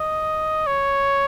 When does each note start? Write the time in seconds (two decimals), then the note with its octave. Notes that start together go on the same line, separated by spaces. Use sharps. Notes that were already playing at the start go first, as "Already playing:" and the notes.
Already playing: D#5
0.67 C#5